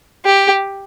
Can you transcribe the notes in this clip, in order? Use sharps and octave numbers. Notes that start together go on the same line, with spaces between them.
G4